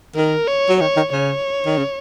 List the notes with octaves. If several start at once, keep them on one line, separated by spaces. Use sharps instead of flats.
D#3 A#4
C#5
F#3
D#3 C#5
D#3
C#3 C#5
D#3
C#3